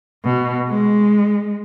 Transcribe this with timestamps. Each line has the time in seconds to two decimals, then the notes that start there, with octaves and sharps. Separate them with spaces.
0.25 B2
0.69 G#3